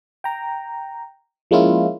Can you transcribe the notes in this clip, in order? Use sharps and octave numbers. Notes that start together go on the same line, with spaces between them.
G5 A#5
F3 G#3 A#3 C#4 E4 F4